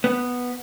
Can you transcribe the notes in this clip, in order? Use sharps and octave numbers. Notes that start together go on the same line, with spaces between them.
B3